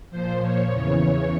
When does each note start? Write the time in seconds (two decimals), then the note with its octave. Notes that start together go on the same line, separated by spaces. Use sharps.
0.10 A#2 F3 C5
0.40 C#5
0.70 E2 C#3 E3 C#5